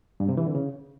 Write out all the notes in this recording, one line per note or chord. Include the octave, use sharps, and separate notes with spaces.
G2
C3
E3
D3
C#3